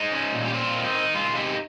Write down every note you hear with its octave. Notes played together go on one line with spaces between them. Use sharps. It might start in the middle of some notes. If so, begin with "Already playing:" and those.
Already playing: G#3 D#4
C#4
A#2
G4
C4 F4
D#3
D#4
D#3
G#3 F4
C3 D#4 G4